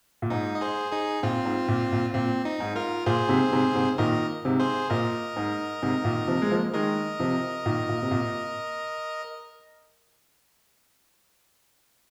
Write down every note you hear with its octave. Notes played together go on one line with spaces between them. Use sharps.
A#2
G#2 D#4
D#5
G#4 C5
D#4 G#4
A#2 C4 F4
G#2
A#2
A#2
A#2 C4
D#4
G#2
F4 A#4
A#2 G#4 C5
G#2 C3
G#2 C3
G#2 C3
A#2 D#3 A#4 D#5
G#2 C3
G#4 C5
A#2 A#4 D#5
G#2
G#2 C3
A#2 D#3
C3 F3
G#3
F3 A#3
D#3 G#3 A#4 D#5
C3 F3
A#2 D#3
A#2
C3
A#2